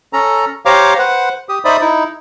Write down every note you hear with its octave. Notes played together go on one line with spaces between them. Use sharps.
C#4 A4 A#5
G4 C5 C#5 F5 A#5 D6
B4 C5 F#5
G4 D#6
D#4 C5 D5 E5 B5 D#6
D#4 E4